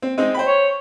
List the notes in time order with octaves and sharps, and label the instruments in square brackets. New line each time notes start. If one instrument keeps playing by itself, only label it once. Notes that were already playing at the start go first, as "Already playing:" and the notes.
[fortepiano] C4
G#3 C4 D#4
C5 G5 B5
[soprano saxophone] C#5